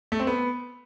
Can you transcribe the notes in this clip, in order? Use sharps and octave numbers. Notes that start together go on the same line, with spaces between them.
A3
C4
B3